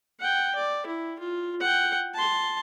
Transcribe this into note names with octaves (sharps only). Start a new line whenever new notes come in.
F#5 G5
D5
E4
F4
F#5 G5
A5 C6